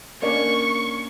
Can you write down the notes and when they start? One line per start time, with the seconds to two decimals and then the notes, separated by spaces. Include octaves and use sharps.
0.22 A#3 C#4 D4 C#6